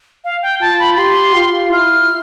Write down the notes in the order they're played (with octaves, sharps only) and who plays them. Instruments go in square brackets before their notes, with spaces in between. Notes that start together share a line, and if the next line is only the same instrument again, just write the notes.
[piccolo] F5
G5
[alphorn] F4 [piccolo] A5
[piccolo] B5
B5
[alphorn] G4 [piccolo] C6
[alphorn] F4
[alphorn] E4 [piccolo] F6